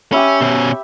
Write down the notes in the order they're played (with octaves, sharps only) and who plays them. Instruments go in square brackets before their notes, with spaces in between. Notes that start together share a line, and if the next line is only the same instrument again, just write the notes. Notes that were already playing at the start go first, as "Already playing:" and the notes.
[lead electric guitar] C#4 [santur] G4 E5 B5
[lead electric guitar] B2 C#4